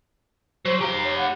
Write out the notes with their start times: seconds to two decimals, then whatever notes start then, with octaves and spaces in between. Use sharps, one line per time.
0.66 F#3 C5
0.81 G4 F5 A#5
1.04 C#5
1.18 F#5